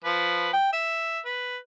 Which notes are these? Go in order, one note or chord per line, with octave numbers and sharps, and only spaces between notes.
F3 B4
G5
E5
B4